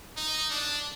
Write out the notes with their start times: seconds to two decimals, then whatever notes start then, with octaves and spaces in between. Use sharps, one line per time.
0.17 D#4
0.50 D4